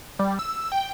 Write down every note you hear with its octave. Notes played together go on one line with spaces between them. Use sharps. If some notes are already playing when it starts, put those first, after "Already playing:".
G3
E6
G5